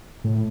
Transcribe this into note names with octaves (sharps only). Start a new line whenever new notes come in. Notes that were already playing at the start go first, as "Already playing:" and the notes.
A2